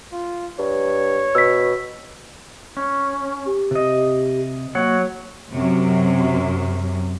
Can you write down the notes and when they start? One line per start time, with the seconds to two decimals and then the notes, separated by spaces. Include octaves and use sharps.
0.12 F4
0.59 G2 C#5
1.35 B2 E6 B6
2.77 C#4
3.46 G4
3.71 C3 D#5
4.75 F#3 A#3 C#5 F#5
5.51 F#2 C3